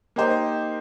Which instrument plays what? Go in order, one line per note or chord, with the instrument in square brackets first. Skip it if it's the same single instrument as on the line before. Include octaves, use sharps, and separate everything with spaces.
[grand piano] A#3 D#4 G4 C5